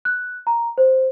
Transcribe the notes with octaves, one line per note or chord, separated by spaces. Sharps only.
F#6
A#5
C5